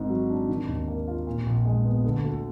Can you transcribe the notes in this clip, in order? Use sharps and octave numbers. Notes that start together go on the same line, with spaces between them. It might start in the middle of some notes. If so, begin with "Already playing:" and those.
Already playing: G#1 G#2
F#3
D4
D#3
D#2
A#3
F4
A#2
A#1
G#3
B3
D3
D2